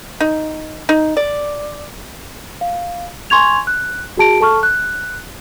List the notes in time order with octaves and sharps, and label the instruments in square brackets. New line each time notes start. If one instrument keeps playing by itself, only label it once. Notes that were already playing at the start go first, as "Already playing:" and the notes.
[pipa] D#4
D#4
D5
[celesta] F5
G#5 C6 C#6 G#6 F7
F#6
F#4 G#4 A5 D7
A4 A5 C#6 F6
F#6